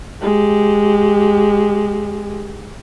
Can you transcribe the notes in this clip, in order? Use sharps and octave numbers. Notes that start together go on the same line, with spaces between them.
G#3 G4